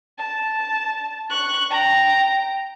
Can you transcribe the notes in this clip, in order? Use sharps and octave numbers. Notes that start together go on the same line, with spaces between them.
A5
C#6 F#6
G5 A#5